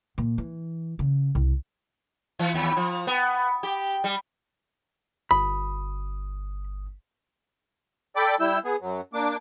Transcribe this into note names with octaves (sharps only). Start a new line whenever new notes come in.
A#2
E3
C#3
C2
E3
D#2
F3
B3
G4
G3
G1 B5 D#6
A4 D5 G5 B5 D6
G3 E4 E6 G6
B3 G#4
F#2 F#3
A#3 D4 D6